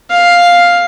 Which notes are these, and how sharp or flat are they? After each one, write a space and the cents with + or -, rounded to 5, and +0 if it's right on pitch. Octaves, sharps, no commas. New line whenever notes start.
F5 +5